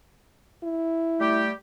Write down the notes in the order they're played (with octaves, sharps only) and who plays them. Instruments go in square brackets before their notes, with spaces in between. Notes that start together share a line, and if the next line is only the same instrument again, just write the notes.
[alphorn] E4
[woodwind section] G3 A3 G4